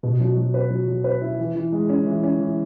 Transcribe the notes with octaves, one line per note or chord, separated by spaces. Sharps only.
B2
F#3
F#3
B4
F#3
F#3
B4
E4
E3
E3
G#3
C#4
E3
C#4
E3